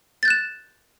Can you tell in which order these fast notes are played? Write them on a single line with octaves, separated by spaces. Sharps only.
A6 G6 F#6 E7